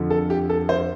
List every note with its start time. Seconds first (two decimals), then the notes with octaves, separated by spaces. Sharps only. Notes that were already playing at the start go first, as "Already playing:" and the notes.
Already playing: F2 D3 F3
0.10 A4
0.30 G4
0.50 A4
0.69 C5